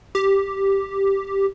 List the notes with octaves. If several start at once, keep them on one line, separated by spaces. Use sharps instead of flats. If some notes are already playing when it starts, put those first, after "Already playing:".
G4